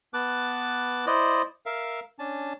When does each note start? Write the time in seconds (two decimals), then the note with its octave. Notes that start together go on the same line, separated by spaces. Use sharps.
0.14 B3 B4 A5 D6 F#6
1.06 E4 C5 D5 D#5
1.66 A#4 E5 F5
2.19 C#4 D4 A5